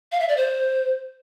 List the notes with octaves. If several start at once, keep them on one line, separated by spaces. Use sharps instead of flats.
F5
E5
D5
C5